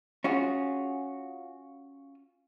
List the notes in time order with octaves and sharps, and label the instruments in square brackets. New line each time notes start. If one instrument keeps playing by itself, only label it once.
[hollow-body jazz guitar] C#4 F4 F#4 G#4